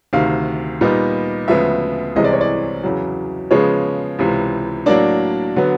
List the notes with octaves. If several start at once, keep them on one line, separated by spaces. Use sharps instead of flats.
D2 C3 D#3 F5
A#2 G3 B3 D#4
D2 C#3 F3 G#3 B3 E5
C2 C3 E3 G#3 C4 D#5
D5
C#5
D5
E2 C#3 F#3
C#3 F3 G#3 B3 C#5
C#2 C3 E3
A2 F#3 A#3 D4 D5
D3 F#3 B3